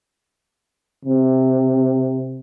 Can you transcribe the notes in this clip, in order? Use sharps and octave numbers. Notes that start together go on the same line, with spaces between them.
C3